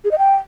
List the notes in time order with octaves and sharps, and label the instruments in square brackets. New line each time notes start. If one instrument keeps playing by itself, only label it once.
[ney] G#4
D#5
G5